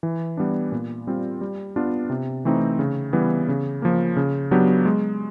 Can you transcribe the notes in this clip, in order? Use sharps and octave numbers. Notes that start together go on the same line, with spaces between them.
E3
G3 B3 D4
A#2
G3 C4 F4
G3
B3 D4 F4
C3
E3 A3 C4 D#4
C#3
E3 G3 B3
C#3
F3 A#3
C#3
F#3 B3 D4 G4
G#3